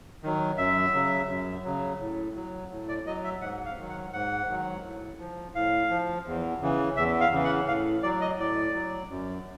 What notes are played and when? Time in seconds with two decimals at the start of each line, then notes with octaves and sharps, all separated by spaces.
0.23 D#3 F#3
0.58 F#2 E5
0.94 C#3 F#3
1.29 F#2
1.64 C#3 F#3
2.01 A2
2.36 F#3
2.70 A2
2.89 D5
3.06 F#3 D#5
3.24 E5
3.41 G#2 F#5
3.66 F5
3.78 D#3 F#3
3.89 F#5
4.13 G#2 F#5
4.48 D#3 F#3
4.84 A2
5.19 F3
5.55 A2 F5
5.90 F3
6.26 E2
6.61 C#3 E3
6.97 E2 E5
7.21 F5
7.32 C#3 E3
7.44 F#5
7.68 A2 F5
8.03 F#3 D5
8.21 D#5
8.39 A2 D5
8.74 F#3
9.10 F#2